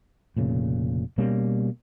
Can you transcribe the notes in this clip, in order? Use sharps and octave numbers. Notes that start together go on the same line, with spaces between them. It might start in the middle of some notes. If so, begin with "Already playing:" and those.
F1 A#2 C#3
B2 G3 A#3 C#4